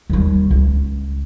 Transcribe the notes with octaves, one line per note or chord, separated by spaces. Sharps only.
D#2 G3
C#2